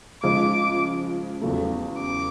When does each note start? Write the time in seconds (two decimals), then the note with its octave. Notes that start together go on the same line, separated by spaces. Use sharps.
0.23 C#3 F3 G#3 D6
1.41 E2 C#3 F#3 A3
2.00 D6